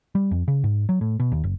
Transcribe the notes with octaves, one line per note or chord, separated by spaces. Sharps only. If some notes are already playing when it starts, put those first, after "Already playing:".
G3
F2
C#3
G#2
F#3
A2
B2
D#2
F#1